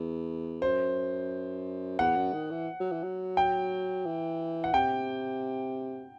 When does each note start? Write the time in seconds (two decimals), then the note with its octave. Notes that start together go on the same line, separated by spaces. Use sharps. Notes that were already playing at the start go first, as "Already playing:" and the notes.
Already playing: E2
0.62 F#2 C5
1.99 E2 F#5
2.16 F#2
2.34 D#3
2.51 E3
2.80 F#3
2.92 E3
3.03 F#3
3.37 G5
4.06 E3
4.64 F#5
4.73 C3 G5